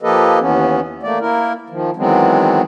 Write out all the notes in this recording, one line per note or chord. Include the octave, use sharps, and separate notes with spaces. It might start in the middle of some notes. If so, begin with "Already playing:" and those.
F3 A#3 G4 A4 B4 D#5
D#2 E3 B3 C#4
A3 A#3 D5
A#3 E4 A#4
D#3 F3
D#3 E3 F#3 G#3 B3 C4